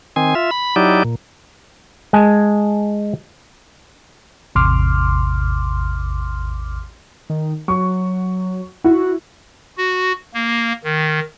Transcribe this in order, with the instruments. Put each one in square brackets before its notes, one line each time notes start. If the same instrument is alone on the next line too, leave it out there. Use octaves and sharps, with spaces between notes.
[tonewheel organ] D#3 C4 G#5
F4 E5
B5
F#3 D#4 E4 G4 D5
A#2
[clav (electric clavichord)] G#3 G#5 A5
[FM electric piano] A1 E2 C3 C6 D6 F6
[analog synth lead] D#3
[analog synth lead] F#3 [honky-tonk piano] C#6
[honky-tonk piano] E4 [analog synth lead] F#4
[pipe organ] F#4
A#3
D#3